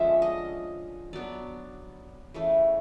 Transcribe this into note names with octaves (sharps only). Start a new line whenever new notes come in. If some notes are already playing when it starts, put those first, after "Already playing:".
Already playing: D3 F3 G#3 C#4 E5
D#5
F#3 B3 D4 D5
C#3 E3 A3